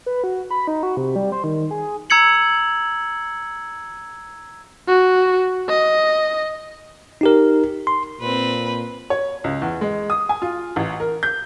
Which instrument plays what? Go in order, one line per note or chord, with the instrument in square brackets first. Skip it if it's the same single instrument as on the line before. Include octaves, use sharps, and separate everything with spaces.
[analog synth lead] B4
F#4
B5
D#4
F#4
C3
G3
C5
D#3
G#4
[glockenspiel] A#5 E6 G#6 C#7 F#7
[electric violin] F#4
D#5
[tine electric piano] D#4 G4 A#4
C6
[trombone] A#2 [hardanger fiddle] C4 B4
[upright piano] C#5
C#2
E2
G#3
D#6
G#5
F4
A1
A#4
G6